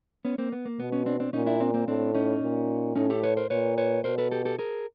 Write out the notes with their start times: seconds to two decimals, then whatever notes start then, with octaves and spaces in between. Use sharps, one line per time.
0.25 B3 C#4
0.38 A#3 C4
0.52 B3
0.65 A#3
0.79 B2 B3
0.92 B3 C#4
1.06 C4 D4
1.20 C4 D4
1.33 A#2 C#4 D#4
1.46 D4 E4
1.60 C4 D4
1.74 A#3 C4
1.87 A2 C4 D4
2.14 C#4 D#4
2.42 A#2
2.95 A2 C#4 D#4
3.10 G4 A4
3.23 B4 C#5
3.37 A#4 C5
3.50 A#2 B4 C#5
3.78 B4 C#5
4.04 B2 A#4 C5
4.18 A4 B4
4.31 G4 A4
4.45 G4 A4
4.59 G#4 A#4